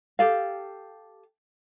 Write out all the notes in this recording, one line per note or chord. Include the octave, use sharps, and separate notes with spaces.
G4 A4 F5